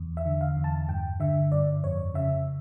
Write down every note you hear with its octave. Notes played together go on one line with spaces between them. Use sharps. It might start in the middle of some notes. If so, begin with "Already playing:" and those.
Already playing: E2
E5
D3
F5
E2
A5
G2 G5
D3 E5
G2 D5
F2 C#5
C#3 E5